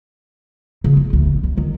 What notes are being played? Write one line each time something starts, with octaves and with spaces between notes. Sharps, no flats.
C#3
D#4
D2
D#1
D#2
D#3